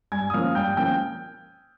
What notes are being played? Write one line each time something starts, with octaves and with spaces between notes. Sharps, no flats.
G2 G#5 G#6
D#6
F3 A#3 C#4 F5 F6
G2 G5 G6
F3 A#3 C#4 G5 G6